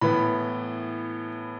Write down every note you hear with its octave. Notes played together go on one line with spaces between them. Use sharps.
A2 E3 B3 B5